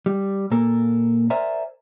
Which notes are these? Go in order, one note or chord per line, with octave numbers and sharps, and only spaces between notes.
G3
A#2 A#3 A4 A#4
A#4 C5 D5 E5 G#5 A#5